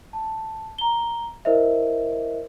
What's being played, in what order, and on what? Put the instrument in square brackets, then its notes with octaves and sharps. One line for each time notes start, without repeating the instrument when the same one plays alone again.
[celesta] A5
A#5 G7
E4 A#4 C5 D#5 E5